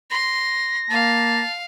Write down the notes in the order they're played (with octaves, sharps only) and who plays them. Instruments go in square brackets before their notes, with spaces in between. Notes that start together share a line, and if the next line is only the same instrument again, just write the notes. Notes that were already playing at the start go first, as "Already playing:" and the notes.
[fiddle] C6 [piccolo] A#6
[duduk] A#3 [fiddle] F5 [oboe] A5